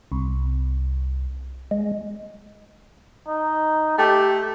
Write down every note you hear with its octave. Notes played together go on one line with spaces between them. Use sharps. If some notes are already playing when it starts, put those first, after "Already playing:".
C2
G#3
D#4
A3 G4